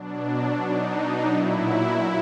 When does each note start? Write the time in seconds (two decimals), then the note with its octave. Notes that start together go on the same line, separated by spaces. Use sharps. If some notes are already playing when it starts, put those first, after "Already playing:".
Already playing: B2 F#3 D4
0.62 D#4
1.32 A#2 F#3 E4